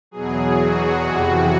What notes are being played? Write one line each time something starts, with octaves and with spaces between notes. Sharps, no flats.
E2 B2 F#3 G#4
F#4
F2 C3 E3 F#4